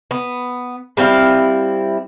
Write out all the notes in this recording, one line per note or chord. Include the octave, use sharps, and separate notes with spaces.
B3
G3 C4 E4 F5